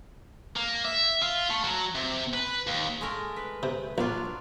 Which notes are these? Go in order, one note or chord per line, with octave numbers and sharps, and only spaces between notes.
A#3
E5
F4
A3
F#3
C3
B4
D#2
G#3 A3 A#4
B4
C3
A#1 F#3 D4 F4